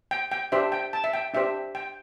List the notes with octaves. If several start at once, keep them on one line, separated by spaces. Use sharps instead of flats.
G5
G5
D4 G4 C5 E5
G5
A5
E5
G5
D4 G4 C5 E5
G5